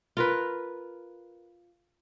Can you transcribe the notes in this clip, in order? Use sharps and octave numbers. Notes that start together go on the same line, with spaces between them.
F4 A#4 B4